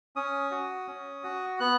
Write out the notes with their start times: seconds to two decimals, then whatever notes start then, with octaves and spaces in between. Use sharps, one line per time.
0.16 C#4 D#6
0.51 F#4
0.88 C#4
1.24 F#4
1.60 B3 F#6